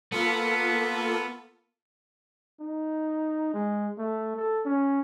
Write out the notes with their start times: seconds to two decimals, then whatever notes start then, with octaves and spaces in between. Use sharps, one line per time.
0.12 A#3 B3 F4 A4
2.60 D#4
3.54 G#3
3.98 A3
4.37 A4
4.65 C#4